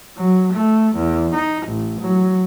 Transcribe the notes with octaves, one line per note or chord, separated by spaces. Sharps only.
F#3
A3
E2
D#4
A1
F#3